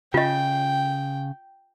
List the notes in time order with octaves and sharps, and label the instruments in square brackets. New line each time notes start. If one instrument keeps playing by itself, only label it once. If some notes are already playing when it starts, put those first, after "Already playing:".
[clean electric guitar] C#3 [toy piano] F4 D#5 [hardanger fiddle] G5